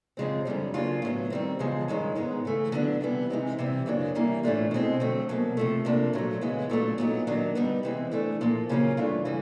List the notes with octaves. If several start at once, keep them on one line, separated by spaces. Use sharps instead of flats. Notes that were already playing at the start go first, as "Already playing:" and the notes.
F#2 C#3 F3 G#3 C4
F#2 D3 G3 C4
C#3 F#3 A#3 D4 F4
A2 F#3 B3
D#3 G3 C4
E2 C#3 F3 G#3
G2 D#3 G#3 C#4
G#2 D#3 G#3 B3
C#3 E3 A3
D3 F#3 B3 D4
C3 E3 G3 B3
C3 E3 G#3 C4 D#4
C3 E3 G3 C4
F#2 C#3 F#3 A#3 D4
C3 E3 G3 A#3
A2 E3 A3 D4 F4
B2 G#3 C4
F2 D3 F#3 A3 C4
E2 B2 F#3 A#3
C3 F3 A3
C3 F3 A#3 D4
A#2 F#3 A3
C#3 E3 G#3 B3
A#2 F#3 A3 D4
A#2 F#3 B3 D#4
D#3 F#3 A#3 D4
D3 G3 B3 D#4
C3 E3 G#3 C4
E3 A3 D4
A#2 F3 A#3
C#3 F#3 A#3 C#4 F4
G2 E3 A3 D4 F4
C#3 E3 G3